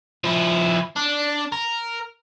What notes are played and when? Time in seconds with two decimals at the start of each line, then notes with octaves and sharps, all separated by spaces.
0.24 F3 E4
0.96 D4
1.52 A#4